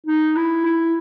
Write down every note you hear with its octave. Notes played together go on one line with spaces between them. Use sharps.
D#4
E4
E4